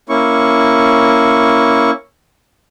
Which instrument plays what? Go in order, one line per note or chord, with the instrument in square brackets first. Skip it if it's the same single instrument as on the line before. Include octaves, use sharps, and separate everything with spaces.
[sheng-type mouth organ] A#3 C#4 E4 C#6